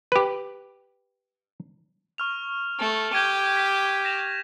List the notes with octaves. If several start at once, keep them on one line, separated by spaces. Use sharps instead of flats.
G4 B4
C#6 F6 F7
A3
G4 G6 G#6 D#7
B6
A#6 E7 F7